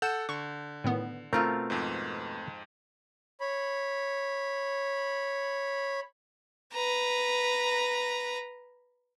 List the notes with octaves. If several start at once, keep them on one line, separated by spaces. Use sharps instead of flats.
A4 F#5 G6 E7
D3 C#6
A2 D#3 B3
B2 A3 C4 F4 A#4 A#5
F2 G#2
C#5 B5
B4 A#5